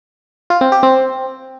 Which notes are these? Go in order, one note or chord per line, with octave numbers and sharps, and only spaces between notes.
F4
C4
G4
C4